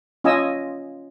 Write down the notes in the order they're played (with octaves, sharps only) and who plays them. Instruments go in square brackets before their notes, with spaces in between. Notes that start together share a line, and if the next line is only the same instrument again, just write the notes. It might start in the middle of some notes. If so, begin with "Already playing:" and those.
[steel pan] C#4 F4 D#5 G#5 E6